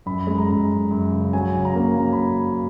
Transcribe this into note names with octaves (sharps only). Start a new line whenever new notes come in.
F#2 B5
G#3
A#5
F#2
F#2
F#2
C#3
F#3 G#5
C#3
A#5
A#3
F#3 A#5
B5